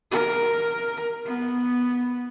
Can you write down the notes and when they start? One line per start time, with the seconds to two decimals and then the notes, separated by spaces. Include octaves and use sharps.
0.11 A#4
1.26 B3